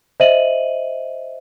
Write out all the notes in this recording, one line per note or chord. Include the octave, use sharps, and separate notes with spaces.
C5 D#5 E5 D#7 F#7